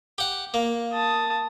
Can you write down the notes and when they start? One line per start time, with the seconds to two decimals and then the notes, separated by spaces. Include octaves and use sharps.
0.18 G4 F#5
0.54 A#3
0.93 A5 D#6